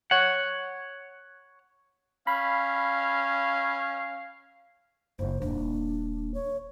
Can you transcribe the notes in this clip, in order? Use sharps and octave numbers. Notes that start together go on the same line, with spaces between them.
C#5 F#5
C#4 F5 B5
F#1 C5
D#1 A#3 D4
C#5